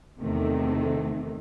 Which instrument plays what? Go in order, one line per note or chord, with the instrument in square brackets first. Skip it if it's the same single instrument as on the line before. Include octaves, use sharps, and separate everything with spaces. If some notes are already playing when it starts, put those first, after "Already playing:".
[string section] E2 C3 D#3 A3